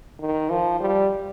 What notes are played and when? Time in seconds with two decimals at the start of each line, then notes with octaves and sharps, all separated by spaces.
0.20 D#3
0.50 F3
0.80 G3